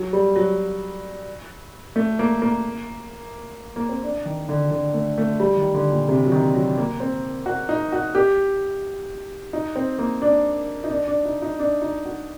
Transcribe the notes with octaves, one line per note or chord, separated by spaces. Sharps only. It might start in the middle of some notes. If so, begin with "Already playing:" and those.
Already playing: F#3
G3
F#3
A3
A#3
A#3
A#3
C4
D4
D#3
D3
D3
A3
A3
G3
D#3
D3
A#2
C3
F#3
D#3
F#3
A#3
C4
F#4
D#4
F#4
G4
D#4
C4
A#3
D4
D#4
D4
D4
D#4
D#4
D4
D#4
F#4